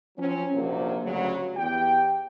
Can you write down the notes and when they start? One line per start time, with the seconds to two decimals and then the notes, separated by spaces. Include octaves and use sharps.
0.17 F3 F#3 C4 C#4
0.53 A#1 D#2 C3 F#3 A#3
1.02 D2 G2 C#3 F#3
1.56 E2 G4 G5